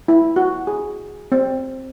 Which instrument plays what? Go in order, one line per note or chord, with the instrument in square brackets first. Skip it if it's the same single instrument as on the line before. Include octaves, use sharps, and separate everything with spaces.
[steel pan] E4
F#4
G#4
C4